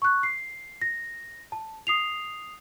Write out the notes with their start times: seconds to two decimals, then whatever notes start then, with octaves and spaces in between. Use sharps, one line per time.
0.02 C#6 F#6
0.23 C7
0.81 A#6
1.52 A5
1.87 D#6 C7 F7